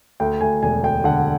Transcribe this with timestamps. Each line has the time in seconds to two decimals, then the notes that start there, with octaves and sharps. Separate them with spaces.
0.20 D2 G5
0.41 D2 G#5
0.63 E1 G#5
0.83 D2 G5
1.04 D3 F#5